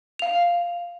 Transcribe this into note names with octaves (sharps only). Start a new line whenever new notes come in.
F5 F7